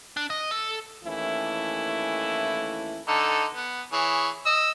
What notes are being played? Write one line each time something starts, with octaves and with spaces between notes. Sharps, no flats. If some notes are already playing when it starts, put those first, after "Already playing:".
D4
D#5
A4
D#2 E3 A3 C#4 E4
D3 D#4 A4
B3
E3 G#4 C#5
D#5 E6